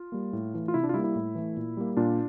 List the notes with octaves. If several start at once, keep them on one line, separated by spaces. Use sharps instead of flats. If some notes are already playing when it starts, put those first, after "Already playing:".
Already playing: F4
G3 A#3
A2
E3 A3
F4
C3 E4
D4
F4
G3 A#3 E4
E4
A2
E3 A3
A#2
G3 A#3
A#2 D4 F4